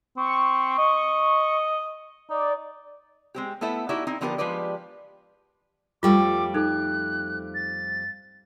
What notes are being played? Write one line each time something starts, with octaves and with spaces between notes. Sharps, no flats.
C4 C#6
D#5
D#4 D5
G#3 C4 G4
A3 B3 E4 A4 E5
D#4 E4 F#4 G4 D5 E5
C4 D#4 E4
D3 F3 B3 G4 A4 A#4
F3 G#3 G4 B4 D5
F2 G3 A3 F4 D6
D#4 A4 F#6
A6